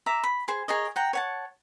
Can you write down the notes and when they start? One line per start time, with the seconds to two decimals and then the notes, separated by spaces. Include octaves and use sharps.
0.06 E5 A#5 D6
0.24 B5
0.48 G#4 C5
0.68 G#4 A#4 C#5 D#5
0.96 F#5 G5 A#5
1.13 C#5 F#5 A5